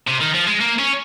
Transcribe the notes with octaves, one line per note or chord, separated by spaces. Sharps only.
C3
D#3
F3
G#3
A#3
C#4